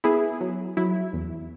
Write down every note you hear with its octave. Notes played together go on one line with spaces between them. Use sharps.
B3 E4 G#4
F#3
F#3 E4
E2